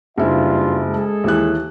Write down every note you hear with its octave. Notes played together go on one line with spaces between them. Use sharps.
F#1 G2 E4 F4 E5
G#3 G#4 A4
D#2 E3 F#6